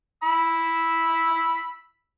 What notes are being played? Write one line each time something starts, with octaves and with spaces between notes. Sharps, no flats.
B5 E6